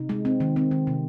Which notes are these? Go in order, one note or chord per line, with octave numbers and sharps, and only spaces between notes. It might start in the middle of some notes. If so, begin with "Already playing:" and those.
Already playing: C3 D#4
G#3
C4
D#3
C4
D#3
C3